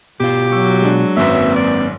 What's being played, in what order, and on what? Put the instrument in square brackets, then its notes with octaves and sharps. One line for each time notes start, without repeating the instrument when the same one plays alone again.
[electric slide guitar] B2 F4 [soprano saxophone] G4
[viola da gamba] F#3 [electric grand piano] C#6 E6
[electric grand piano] G#3 D4
[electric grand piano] G#1 F#2 [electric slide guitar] A#3 C4 B4 [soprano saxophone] E5
[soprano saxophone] D5